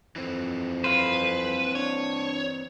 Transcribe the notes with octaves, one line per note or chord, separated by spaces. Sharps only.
F2 E3 C4
B4 C5 F5
D4 C#5